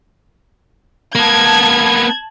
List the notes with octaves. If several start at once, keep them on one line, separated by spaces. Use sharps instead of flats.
A#3 B3 A5 G#6